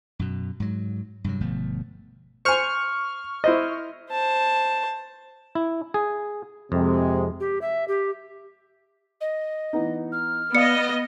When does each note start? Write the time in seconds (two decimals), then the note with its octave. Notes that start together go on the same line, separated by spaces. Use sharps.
0.19 F#2 B2
0.60 G#2 F#3
1.24 G2 C3 F#3
1.40 G1 B2 F3 A3
2.45 C5 G#5 C#6 F6
3.44 E4 C5 D#5
4.11 C5 A5
5.55 E4
5.94 G#4
6.72 F2 C3 G#3
7.40 G4
7.62 E5
7.88 G4
9.21 D#5
9.73 E3 B3 D#4
10.12 F6
10.55 B3 D5 D#5 F5 D#6 C#7